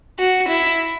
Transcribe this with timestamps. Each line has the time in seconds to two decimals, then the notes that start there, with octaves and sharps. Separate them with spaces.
0.19 F#4
0.49 E4